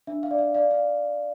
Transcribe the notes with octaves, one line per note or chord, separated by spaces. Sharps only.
D4 E5
F5
D5
F5
D5 F5
F5